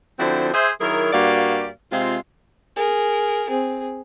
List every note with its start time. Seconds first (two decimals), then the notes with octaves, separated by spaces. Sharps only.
0.19 D3 F3 C4 E4 F#4 C5
0.54 G#4 C5 E5
0.81 D#3 F#3 E4 G#4 A#4
1.12 G2 A#3 F#4 G4 D5 F5
1.92 C3 G#3 C4 F4
2.76 G#4 A#4
3.49 C4 G#4